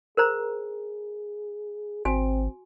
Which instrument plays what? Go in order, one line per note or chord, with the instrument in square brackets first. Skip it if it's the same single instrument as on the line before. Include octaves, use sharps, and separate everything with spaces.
[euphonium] G#4 [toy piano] A#4 C5 A#5
[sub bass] G#1 [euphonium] C4 [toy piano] F#4 G#5